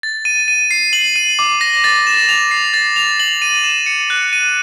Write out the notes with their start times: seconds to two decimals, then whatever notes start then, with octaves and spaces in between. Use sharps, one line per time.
0.03 A6
0.25 D#7
0.48 D#7
0.71 C7
0.93 F#7
1.16 D#7
1.39 D6
1.61 A#6
1.84 A6
2.07 E7
2.29 F7
2.51 C7
2.74 A6
2.96 F7
3.20 F#7
3.42 D#7
3.64 E7
3.86 C#7
4.10 F#6
4.33 D#7